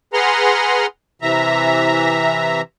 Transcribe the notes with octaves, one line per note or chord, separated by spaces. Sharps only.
G#4 B4 F#5 A#5 C6 F6
C3 E3 E5 A#5